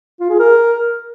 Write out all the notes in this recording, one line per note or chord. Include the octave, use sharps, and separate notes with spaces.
F4
G#4
A#4